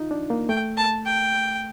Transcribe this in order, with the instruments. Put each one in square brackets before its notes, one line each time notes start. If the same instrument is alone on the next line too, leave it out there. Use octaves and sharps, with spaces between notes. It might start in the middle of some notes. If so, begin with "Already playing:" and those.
Already playing: [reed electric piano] D#4 F4
D4
A#3
[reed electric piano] A3 [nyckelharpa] G5
[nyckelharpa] A5
G5